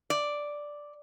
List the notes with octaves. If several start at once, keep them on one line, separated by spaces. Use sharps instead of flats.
D5